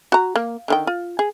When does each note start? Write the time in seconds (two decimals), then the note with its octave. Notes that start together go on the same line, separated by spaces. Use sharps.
0.12 F#4 A#5
0.36 A#3
0.68 D3 D#3 G5
0.87 F4
1.19 G#4